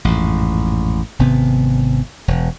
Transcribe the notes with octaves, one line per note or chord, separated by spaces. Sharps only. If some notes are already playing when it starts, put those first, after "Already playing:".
A1 F2 G#2
G#1 C3 B3
E1